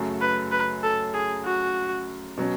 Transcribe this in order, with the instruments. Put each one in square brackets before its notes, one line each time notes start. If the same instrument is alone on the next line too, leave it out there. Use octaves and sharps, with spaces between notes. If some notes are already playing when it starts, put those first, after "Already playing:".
Already playing: [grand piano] F#2 C#3 F#3 A3
[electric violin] B4
B4
A4
G#4
F#4
[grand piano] B2 F#3 C#4